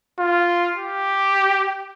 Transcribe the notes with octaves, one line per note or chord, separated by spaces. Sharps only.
F4
G4